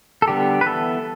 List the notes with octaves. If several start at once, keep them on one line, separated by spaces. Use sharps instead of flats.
A4
D3 G3 B3 G4
B4
E3 B3 A4